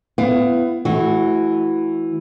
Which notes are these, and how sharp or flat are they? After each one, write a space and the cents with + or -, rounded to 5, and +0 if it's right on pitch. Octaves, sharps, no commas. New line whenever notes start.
B3 +20 E4 +35 F5 +30
E3 +0 A3 -35 F#4 +0